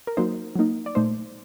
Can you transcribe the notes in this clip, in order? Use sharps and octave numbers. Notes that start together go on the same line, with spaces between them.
A#4
F#3 A#3 D#4 C5
F#3 A#3 D#4
D5
A#2 A3 D#4 C5